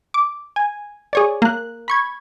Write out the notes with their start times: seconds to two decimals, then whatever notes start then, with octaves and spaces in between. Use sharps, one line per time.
0.14 D6
0.56 G#5
1.13 G#4 C#5 D5
1.42 A#3 F#6
1.88 B5 C#6 G#6